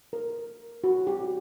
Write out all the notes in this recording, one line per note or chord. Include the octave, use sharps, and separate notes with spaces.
A#4
F#4
G4